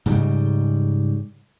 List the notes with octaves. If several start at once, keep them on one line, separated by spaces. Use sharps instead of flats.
G#2 C#3 G3